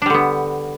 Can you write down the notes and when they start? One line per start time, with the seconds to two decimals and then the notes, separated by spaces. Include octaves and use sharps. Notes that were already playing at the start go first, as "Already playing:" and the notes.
0.02 D4
0.06 G3
0.10 D3
0.14 B3